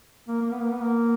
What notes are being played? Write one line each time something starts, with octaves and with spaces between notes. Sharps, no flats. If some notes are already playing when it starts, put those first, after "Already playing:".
A#3
A#3
B3
A#3
B3
A#3